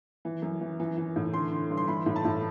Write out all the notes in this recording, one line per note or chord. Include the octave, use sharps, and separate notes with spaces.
E3
F#2
E3
E3
E3
A2
D3 C6
D3
G2
C6
E3 B5
A2
A5
A2